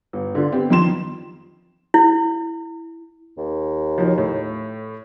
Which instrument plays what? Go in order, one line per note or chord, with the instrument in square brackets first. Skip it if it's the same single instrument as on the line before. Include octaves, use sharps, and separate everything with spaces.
[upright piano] G1
D3 F4
B3 C4 G4
F2 D#3 F3 C6 E7
[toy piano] E4
[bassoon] D#2
[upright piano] F3 F#3 D#4
A2